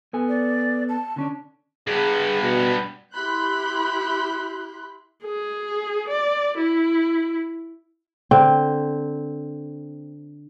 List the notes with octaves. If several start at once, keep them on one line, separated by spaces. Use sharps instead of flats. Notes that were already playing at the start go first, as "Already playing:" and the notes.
B3 A4 G#5
D5
A5
D3 C#4 D4
G2 B3 G#4
B2
E4 G4 B5 C6 F#6 G6
G#4
D5
E4
D3 C4